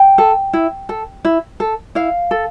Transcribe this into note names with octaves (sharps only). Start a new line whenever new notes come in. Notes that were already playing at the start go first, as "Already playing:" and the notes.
Already playing: G5
A4
E4
A4
E4
A4
E4 F5
A4